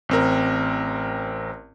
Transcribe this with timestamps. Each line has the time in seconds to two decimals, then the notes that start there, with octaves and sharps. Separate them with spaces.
0.09 A1 C4 A#4